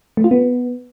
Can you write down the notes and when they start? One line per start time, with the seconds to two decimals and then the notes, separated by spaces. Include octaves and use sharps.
0.17 A3
0.24 F4
0.31 B3